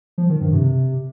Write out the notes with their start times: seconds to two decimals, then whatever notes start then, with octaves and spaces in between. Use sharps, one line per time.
0.18 F3
0.29 D#3
0.41 G2
0.53 C3